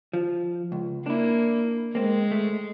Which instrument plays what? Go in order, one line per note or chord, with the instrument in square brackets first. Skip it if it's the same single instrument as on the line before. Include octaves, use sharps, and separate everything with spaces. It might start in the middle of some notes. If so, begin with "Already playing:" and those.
[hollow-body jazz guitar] F3
C#2
[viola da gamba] A#3 [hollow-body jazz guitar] D4 E4
[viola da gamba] G#3 [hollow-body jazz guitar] A#3 C4
[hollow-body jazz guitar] A3